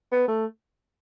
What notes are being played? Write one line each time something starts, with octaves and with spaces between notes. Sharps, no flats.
B3
A3